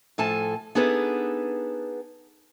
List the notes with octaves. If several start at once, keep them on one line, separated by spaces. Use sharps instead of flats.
A2 F3 A4 G#5 A5
B3 D4 D#4 G#4 A4 B4